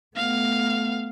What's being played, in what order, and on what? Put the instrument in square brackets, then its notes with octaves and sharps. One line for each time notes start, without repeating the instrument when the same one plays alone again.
[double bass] A3 B3 [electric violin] F5